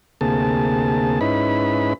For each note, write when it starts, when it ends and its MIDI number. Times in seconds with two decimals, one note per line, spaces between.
0.21 1.19 38
0.21 1.19 48
0.21 1.19 58
0.21 1.19 68
0.21 1.19 81
1.21 1.93 44
1.21 1.93 61
1.21 1.93 63
1.21 1.93 64
1.21 1.93 71
1.21 1.93 83